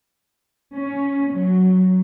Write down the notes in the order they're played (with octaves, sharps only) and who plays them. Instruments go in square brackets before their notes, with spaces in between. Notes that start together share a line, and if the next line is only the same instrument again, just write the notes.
[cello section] C#4
F#3